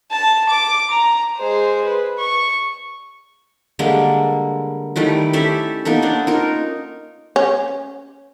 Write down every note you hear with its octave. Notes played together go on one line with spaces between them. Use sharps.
A5
D6
A#5
G#3 C5
B4
C#6
D3 G3 G#3 A#3
D#3 G3 A3 E4
C#4 G4 A4 E5
A#3 B3 D#4 A4
C#4 D4
D#4 F4 A#4
C#4